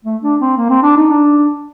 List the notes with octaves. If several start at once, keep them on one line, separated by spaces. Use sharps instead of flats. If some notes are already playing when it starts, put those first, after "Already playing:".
A3
D4
C4
A#3
C4
D4
D#4
D4